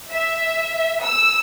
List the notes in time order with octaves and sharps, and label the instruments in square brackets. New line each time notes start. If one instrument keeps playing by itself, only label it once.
[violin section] E5
E6